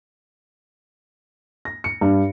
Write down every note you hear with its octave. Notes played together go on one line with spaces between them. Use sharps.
A#6
C#7
G2